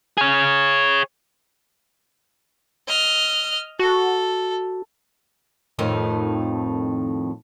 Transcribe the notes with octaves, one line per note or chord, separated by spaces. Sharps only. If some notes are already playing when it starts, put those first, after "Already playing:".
G#4 C#5
D#5 F6
F#4 A4
F2 A2 D#3